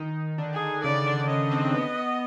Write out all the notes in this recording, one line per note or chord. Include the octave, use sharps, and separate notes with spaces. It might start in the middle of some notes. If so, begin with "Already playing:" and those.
Already playing: D#3 D#4
D3 D4
G#4
C#3 C#4 D5
D3 D4
C#3 C#4 D#5
C4
B3